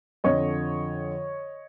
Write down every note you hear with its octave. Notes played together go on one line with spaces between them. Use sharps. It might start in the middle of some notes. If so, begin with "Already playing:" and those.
F2 D3 F3 C#5 D#5